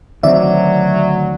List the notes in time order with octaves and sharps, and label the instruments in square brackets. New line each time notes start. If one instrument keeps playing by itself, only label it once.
[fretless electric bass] D2 D#3 C4 [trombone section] F#3 [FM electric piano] D5 E5